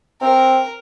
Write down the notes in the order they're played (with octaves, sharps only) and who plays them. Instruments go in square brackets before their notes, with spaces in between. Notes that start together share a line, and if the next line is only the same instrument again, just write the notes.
[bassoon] C4 [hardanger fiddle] A#4